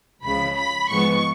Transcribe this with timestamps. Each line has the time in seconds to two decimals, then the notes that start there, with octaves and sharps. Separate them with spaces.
0.23 C#2 C#3 F3 B5
0.56 B5
0.88 G#2 F3 G#3 B3 C#6